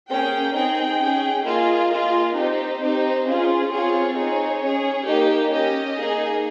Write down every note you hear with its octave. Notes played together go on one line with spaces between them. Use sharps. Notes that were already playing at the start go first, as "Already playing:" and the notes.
A#3 C#4 G#4 G5
C4 D#4 G#4 G5
C#4 G#4
A#3 F4 G#4 D#5
A#3 F4 G#4
C4 D#4 G4 C5
C4 D#4 G4
C#4 F4 G#4
C4 F4 G#4 C#5
C4 D#4 G#4
C#4 G#4
A#3 D#4 G4
C#4 G4 D#5
A#3 D#4 G#4